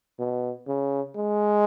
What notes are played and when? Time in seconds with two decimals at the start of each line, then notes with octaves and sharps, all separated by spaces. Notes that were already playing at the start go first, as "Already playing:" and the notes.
0.19 B2
0.68 C#3
1.16 G#3